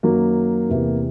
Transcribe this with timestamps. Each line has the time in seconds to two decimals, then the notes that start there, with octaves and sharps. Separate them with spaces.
0.03 F#2 D#3 F#3 A#3
0.69 E2 C3 E3